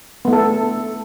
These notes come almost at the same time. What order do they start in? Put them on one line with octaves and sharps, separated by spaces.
B3 A3 E4 A4